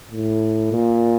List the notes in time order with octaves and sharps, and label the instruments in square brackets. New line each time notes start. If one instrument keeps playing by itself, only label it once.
[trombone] A2
A#2